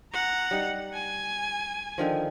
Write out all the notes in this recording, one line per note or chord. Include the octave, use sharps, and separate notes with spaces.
F#5 A#5
G3 D#4
G#5
D3 D#3 F3